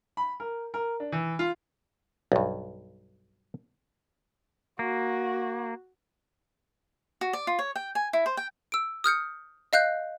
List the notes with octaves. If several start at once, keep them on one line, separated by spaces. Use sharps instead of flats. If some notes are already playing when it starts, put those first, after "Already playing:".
B5
A#4
A#4
D4
E3
F4
B1 G2
A#3 F#4
F#4
D5
F4
C#5
G5
G#5
E4
C5
G5
E6 D7
D#6 F6 G6 C#7
D#5 F5 F#6 G6